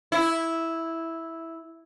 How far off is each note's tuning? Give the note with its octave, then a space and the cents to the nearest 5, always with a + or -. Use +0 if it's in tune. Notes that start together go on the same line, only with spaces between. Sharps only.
E4 -5